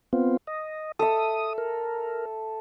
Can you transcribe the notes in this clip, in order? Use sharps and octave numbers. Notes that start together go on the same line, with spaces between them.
B3 C4 F4
D#5
A4 E5 D#6
A#4